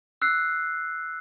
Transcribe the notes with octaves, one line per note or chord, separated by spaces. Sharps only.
E6 F#6 C7